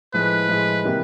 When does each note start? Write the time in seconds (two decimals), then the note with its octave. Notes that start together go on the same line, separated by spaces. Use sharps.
0.14 A2 F3 G#3 B4
0.49 A2 F3 G#3
0.84 C3 E3 G3 A#3